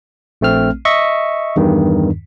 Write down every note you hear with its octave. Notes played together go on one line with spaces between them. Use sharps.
A#1 A3 C4 F6
D#5 E5 C#6
E2 G2 D#3